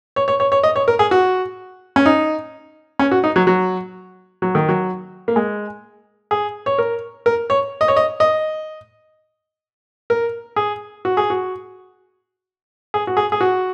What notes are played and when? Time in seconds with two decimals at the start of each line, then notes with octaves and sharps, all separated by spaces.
0.16 C#5
0.28 C#5
0.40 C#5
0.52 C#5
0.63 D#5
0.76 C#5
0.88 A#4
0.99 G#4
1.11 F#4
1.96 C#4
2.06 D#4
2.99 C#4
3.12 F#4
3.24 D#4
3.36 F#3
3.47 F#3
4.42 F#3
4.55 D#3
4.69 F#3
5.28 A#3
5.36 G#3
6.31 G#4
6.66 C#5
6.78 A#4
7.26 A#4
7.50 C#5
7.81 D#5
7.88 C#5
7.96 D#5
8.20 D#5
10.10 A#4
10.56 G#4
11.05 F#4
11.17 G#4
11.30 F#4
12.94 G#4
13.07 F#4
13.17 G#4
13.32 G#4
13.41 F#4